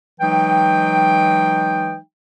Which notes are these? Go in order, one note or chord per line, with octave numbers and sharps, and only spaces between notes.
E3 F#3 G#3 D#4 G5